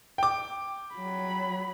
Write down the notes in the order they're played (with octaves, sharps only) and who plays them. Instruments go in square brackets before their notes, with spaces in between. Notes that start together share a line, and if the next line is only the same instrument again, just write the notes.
[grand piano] G5 D6
[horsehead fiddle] F#3 B5